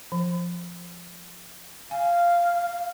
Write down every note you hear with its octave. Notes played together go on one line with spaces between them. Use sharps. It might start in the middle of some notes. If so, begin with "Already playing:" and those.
F3
F5 G#5